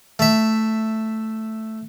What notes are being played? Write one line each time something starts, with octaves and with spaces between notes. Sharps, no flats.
A3 E5